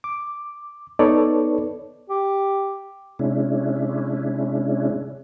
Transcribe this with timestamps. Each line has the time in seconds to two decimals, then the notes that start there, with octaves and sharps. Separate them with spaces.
0.04 D6
0.99 B3 D#4 A4 B4 C#5 D5
2.10 G4
3.19 C3 G#3 C#4 D4 E4